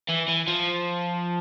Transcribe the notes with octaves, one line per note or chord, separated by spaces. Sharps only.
E3
E3
F3